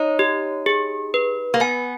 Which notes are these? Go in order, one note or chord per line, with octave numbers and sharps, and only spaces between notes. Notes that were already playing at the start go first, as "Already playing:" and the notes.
Already playing: D#4 C#5
G4
G#4
B4
A#3
B3 G#5